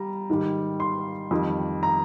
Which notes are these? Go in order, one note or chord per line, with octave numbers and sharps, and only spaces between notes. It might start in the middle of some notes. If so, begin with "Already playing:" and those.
Already playing: G3 A#5
G#2 D#3 G3
C6
F2 D#3 G3
A#5